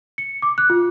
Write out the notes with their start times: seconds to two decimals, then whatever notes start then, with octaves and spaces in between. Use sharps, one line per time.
0.18 C#7
0.42 D6
0.58 F#6
0.70 F4